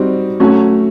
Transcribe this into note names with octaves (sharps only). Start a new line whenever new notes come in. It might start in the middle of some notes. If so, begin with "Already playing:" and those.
Already playing: G3 C4 D#4 F#4
F#3 A3 C#4 F#4